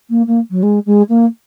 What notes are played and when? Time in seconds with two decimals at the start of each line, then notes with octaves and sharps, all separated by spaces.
0.10 A#3
0.27 A#3
0.51 F#3
0.63 G#3
0.86 G#3
1.09 A#3